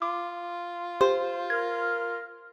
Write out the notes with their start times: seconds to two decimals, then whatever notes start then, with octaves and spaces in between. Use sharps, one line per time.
0.02 F4 D6
1.01 G4 C5
1.50 A#4 F6 G#6